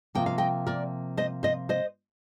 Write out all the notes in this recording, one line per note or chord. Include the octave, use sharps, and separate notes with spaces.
C3 F3 A#3 G5
F5
D#5 G5
A#4 D5
C5 D#5
C5 D#5
C5 D#5